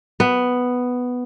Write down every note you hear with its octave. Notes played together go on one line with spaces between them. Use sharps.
B3